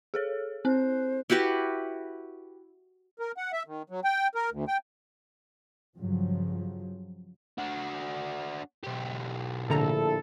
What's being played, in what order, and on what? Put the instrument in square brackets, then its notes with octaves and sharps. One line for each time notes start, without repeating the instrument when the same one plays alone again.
[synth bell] G#4 A4 C#5
[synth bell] C4 F#6 [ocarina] C5
[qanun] E4 F#4 G4 B4
[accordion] A#4
F#5
E5
D#3
F#3
G5
A#4
D2
G5
[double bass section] G2 C#3 F3 F#3
[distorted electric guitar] D4 F#4
B1 G4
[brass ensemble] A#1 E4 A4 [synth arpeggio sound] A2 D3 A#5